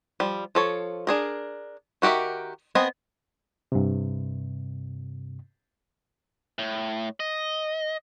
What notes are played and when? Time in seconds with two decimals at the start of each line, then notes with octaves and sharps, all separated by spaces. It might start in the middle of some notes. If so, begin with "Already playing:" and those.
0.20 F3 G3
0.55 F3 A4 C#5
1.07 D4 G#4 A#4
2.02 D#3 F#4 G4 A#4 E5
2.75 B3 C4 D#5 G#5 B5
3.72 G2 C3
6.59 A2
7.20 D#5